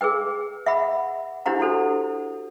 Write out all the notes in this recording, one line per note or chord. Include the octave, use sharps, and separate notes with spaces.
G#4 A#4 B4 G5
E5 F#5 B5
D4 E4 G4 C5 F#5 A#5
D4 F#4 A4 C5